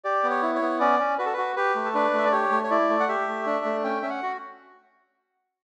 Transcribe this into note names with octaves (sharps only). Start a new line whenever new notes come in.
G4 D5
B3
C#5
E4
C#5
B3
C#4 D5
C#4
F#4 B4
A4
F#4 B4
G4 B4
A3
A4
D4 B4
A3 E5
D5
G4 C#5
A3
C#5
E4 D5
A3
F#5
G4 E5
A3
D4
A3
C#4 G5
C#4 E5
F#5
F#4